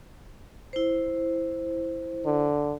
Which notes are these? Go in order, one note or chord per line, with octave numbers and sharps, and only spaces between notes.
E4 C5
D3